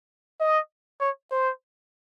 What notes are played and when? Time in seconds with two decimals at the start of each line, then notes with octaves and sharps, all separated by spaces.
0.40 D#5
1.01 C#5
1.31 C5